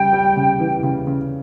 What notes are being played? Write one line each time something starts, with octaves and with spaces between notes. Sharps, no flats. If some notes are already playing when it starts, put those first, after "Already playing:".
Already playing: C#3 G3 G5
G3
C#3
E3
C#3
C#3